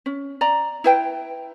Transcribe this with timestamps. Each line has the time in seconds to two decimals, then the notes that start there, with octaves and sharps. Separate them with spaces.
0.06 C#4
0.41 D5 A#5
0.84 E4 B4 G5